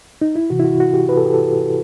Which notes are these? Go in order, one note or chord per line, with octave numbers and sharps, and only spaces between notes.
D#4
E4
C3 E3 F#4
E4
F#4
F#4
G4
B4
A4
G4
A4